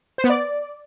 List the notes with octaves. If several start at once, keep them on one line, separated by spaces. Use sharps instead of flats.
C5
B3
D5